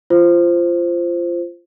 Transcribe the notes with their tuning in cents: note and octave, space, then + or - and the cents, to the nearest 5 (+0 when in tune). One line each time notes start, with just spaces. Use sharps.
F4 -20 C5 +0